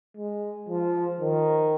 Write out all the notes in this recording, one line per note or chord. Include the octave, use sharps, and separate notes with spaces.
G#3
F3
D#3